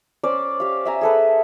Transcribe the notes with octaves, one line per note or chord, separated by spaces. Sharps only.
C#4 C5 D5
G4 F5
E5 G#5 A#5
G#4 A4 B4